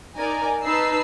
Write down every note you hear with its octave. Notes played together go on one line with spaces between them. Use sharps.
D#4 A#4 D5 G#5 A#5
D#4 B4 A5 B5 E6 C7